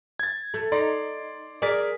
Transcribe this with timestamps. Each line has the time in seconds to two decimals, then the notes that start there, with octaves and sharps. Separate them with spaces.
0.20 G#6 A6
0.54 A3
0.72 D#4 D5 C6
1.62 G#4 A#4 D5 B6